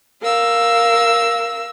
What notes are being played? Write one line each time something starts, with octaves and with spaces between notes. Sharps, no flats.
A#4 F5 E6